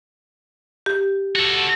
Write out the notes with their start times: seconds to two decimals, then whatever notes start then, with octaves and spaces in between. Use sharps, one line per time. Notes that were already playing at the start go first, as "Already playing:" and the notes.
0.86 G4
1.36 F#4 A4